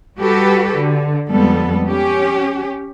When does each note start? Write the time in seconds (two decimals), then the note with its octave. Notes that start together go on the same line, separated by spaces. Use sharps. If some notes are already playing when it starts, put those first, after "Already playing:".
0.18 G3 F#4 G4 A4 B4
0.77 D3
1.29 F2 G3 G#3 B3 A4
1.85 C#4 G4